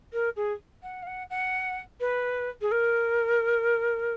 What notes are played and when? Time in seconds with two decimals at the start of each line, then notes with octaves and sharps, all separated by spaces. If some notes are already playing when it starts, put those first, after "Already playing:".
0.13 A#4
0.36 G#4
0.83 F#5
1.02 F5
1.07 F#5
1.30 F#5
2.00 B4
2.61 G#4
2.71 A#4